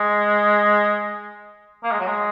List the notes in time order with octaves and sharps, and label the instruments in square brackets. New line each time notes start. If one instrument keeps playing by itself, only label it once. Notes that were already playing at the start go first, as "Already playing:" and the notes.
Already playing: [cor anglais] G#3
A#3
G#3
F#3
G#3